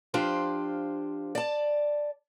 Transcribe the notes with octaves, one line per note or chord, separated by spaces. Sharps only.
F3 D4 F4 G4 C5
D5 A5